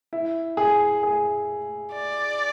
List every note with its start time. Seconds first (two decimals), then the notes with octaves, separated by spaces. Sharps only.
0.13 E4
0.57 G#4
1.03 G#4
1.93 D5